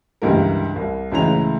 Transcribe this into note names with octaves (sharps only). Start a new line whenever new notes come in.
C#2 G2 D3 E3 G4 A#4
C2
C#2 A2 C#3 E3 A#5 F7